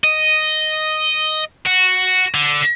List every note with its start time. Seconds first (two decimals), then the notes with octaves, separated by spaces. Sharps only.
0.04 D#5
1.66 F#4
2.34 D3